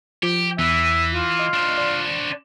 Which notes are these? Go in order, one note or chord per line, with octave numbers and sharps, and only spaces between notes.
F3 G4
E2 E3 E5
F4
D#5
D4 C5
D5